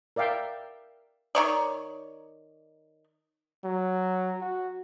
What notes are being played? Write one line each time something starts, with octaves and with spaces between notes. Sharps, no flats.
A#4 D5 E5 F5 G5
D#3 C#5 D5
F#3
F#4